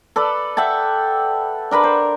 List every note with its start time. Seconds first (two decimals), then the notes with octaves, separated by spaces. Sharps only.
0.16 A4 B4 D5
0.57 E5 F#5 G5 A5
1.71 D4 A#4 B4 B5
1.83 C5